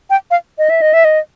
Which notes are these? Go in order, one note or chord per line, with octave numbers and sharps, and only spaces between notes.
G5
F5
D#5
E5
D#5
E5
D#5